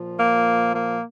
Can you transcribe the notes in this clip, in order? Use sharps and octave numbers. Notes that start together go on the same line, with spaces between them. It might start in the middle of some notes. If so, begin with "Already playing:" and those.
Already playing: A#2 F3
A#3
A#3